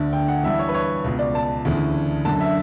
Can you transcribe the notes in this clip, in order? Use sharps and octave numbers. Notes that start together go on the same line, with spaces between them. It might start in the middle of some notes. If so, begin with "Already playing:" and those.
Already playing: D2 D3
G5
F#5
G2 E3 E5
C#5
B4
C#5
C#2 B2
D5
A5
D2 C#3 E3
F#2 D3 A5
E5